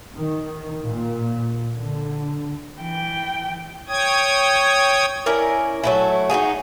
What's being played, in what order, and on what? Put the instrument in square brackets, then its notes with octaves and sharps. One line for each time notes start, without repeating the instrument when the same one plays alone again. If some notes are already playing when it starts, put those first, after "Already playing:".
[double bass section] D#3
A#2
D3
[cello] E3 G5
[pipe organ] C#5 G5 D#6 G#6
[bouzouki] C#4 E4 A#4 D5
F#3 A3 E4
D#4 E4 F#4 G#4